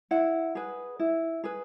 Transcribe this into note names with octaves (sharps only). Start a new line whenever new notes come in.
E4 F#5
G#4 B4
E4
G#4 B4